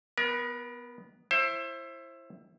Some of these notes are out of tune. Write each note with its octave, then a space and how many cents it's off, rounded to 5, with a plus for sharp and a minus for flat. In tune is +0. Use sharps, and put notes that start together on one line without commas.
B3 +0 A#4 +35
E4 +15 C5 +30